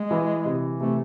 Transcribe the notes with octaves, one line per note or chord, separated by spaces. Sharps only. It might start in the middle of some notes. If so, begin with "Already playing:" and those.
Already playing: G#3
E3
C3
C3 A3